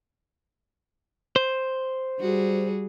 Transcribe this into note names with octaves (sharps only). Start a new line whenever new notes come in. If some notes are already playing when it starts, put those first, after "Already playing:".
C5
G3 F#4 G#4